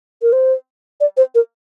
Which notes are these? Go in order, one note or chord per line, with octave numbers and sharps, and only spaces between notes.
A#4
C5
D5
C5
A#4